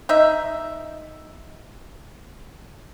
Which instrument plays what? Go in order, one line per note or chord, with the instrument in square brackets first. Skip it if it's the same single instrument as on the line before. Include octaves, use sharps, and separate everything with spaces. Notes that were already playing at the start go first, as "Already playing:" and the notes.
[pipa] D#4 E5